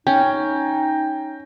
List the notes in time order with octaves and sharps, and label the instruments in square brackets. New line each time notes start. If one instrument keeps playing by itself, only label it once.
[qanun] C#4 [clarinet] D#4 [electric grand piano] G5